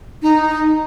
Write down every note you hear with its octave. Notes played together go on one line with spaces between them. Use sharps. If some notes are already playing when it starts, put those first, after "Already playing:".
D#4